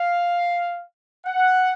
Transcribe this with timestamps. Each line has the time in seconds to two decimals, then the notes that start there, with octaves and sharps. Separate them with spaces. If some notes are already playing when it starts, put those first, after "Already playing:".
Already playing: F5
1.26 F#5